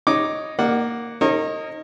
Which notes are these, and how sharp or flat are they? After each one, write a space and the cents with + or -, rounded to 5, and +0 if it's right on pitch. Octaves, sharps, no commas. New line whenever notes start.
D#4 +0 C#5 +0 D6 +0
A#3 +0 D5 +35 F#5 +0
D#4 +0 A#4 -30 C#5 -40